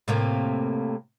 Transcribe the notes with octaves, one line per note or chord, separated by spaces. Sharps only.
A2 C3 A#3